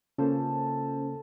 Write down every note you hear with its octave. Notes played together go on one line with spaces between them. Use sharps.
C#3 A#3 C#4 F4 A4 C5